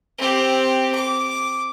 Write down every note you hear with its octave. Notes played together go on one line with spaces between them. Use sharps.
C4 G4
D6